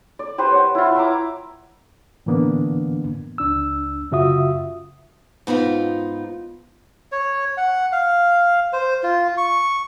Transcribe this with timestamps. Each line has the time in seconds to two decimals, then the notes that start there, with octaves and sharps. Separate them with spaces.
0.19 D5
0.38 G4 B4 C5 G5
0.51 C#5 F#5
0.75 E4 F4
0.95 E5 G5 A#5 D6
2.26 A2 D3 E3 A#3 B3 D4
3.38 C#2 D4 E6
4.11 F#2 C#3 F4 F#4 E5 D#6
5.47 G#2 B3 D#4 F4
7.12 C#5
7.57 F#5
7.92 F5
8.73 C5
9.03 F4
9.37 C#6